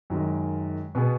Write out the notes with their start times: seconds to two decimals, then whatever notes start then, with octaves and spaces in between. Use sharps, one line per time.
0.10 F#2 D#3 G#3
0.95 B2 B3 G#4